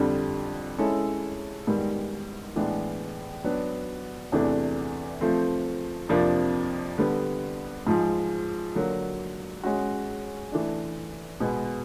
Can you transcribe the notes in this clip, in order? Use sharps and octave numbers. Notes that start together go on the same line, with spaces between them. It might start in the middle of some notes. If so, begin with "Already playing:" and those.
Already playing: F2 D3 G3
G#3 C#4 E4 A4
G#2 D#3 G3 B3
A2 E3 G#3 B3 D4
F#3 B3 D4
E2 C3 E3 A3 D4
F3 A3 C4
F2 C3 F3 A#3 D4
D3 G3 B3
G#2 F3 G#3
D3 F#3 A#3
G#3 C#4 F#4
E3 A3 D4
B2 G#3 B3